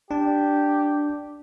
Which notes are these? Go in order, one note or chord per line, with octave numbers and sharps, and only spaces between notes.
D4 G4